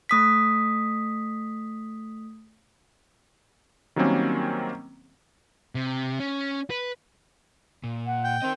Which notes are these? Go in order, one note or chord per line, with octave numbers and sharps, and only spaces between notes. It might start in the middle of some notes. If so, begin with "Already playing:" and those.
A3 D#6 B6
D#3 F#3 G3 A#3 C4 C#4
C3
C#4
B4
A#2
F#5
G5
C4 A#4 D#5